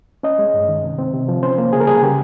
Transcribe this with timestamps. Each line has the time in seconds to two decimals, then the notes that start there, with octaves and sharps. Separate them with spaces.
0.23 C#4 D#5
0.39 G#3
0.54 G2
0.68 D#3
0.83 C3
0.99 C4
1.14 C3
1.28 F3
1.43 C#4 C5
1.58 A#3
1.73 C#3 G#4
1.80 A#4
1.87 G3 G#4
2.02 C#3 G4